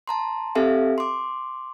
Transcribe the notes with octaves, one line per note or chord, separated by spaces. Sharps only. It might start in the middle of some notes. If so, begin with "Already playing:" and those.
A5 A#5 C6
C4 G4 A4 E5 F5 G#5
C6 D6